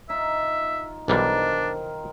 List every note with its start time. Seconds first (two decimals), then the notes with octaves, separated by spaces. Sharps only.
0.10 D#4 F4 E5
1.08 B1 D#3 E3 G3 D4 A#4 C5